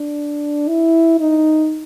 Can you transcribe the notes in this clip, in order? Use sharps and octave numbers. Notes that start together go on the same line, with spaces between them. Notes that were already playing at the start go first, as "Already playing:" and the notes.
Already playing: D4
E4
D#4